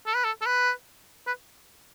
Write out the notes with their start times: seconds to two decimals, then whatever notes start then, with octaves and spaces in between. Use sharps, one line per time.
0.06 A4
0.15 B4
0.24 A4
0.41 A4
0.46 B4
1.27 B4